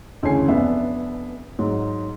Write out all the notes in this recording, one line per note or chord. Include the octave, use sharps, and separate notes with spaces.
D2 C#3 E3 C#4 G#5 C7
F1 B3 D4 E5
G#2 F#3